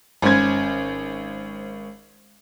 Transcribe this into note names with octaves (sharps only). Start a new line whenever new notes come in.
G#1 C#4 C5 G#6